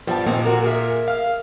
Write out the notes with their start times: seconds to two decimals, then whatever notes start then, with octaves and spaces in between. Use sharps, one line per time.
0.07 G2 F3 G3 B3 A5
0.26 A#2 D#3 F3 A#3 C4
0.45 F#4 A#4
0.64 G#4 A#4 E5
1.08 F5 F6